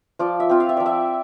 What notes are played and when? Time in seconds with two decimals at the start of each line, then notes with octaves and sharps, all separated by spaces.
0.19 F3 D5
0.40 E5
0.50 C4 F4
0.60 F5
0.69 E5
0.77 F3 D5
0.86 E5